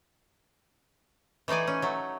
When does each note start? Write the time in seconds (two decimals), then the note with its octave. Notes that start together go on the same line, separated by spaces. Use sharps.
1.48 E3 A3 D#4 D5 G#5
1.67 C#4
1.82 F#3 A3